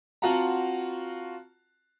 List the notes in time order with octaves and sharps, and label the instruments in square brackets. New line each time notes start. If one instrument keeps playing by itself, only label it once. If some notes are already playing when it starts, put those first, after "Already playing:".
[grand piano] C4 F4 F#4 F#5 A5 A#5